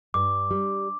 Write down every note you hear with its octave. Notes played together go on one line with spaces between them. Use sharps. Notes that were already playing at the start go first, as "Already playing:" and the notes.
G2 D6
G3